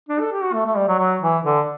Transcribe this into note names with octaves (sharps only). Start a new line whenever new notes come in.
D4
A4
G4
F#4
A3
A3
G3
F#3
F#3
E3
D3